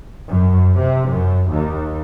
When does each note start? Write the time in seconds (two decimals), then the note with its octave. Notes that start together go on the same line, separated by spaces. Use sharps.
0.28 F#2
0.79 C3
1.09 F#2
1.50 D#2